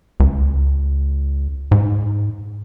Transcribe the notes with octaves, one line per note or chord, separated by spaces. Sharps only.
C#2
G#2